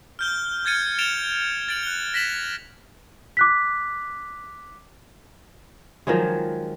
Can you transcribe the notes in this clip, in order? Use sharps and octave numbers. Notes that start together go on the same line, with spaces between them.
F6 G6 G7
F6 G#6 A6 C#7 D#7
A6 D7 E7 F7 G7
A6 D7 F#7
F#6 G7
A#6 B6 E7 F#7
D6 F#6 B6
D#3 F3 F#3 G#3